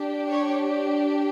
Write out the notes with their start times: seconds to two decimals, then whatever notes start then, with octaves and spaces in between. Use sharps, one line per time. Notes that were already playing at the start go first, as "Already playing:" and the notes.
Already playing: D4 G4
0.28 C#5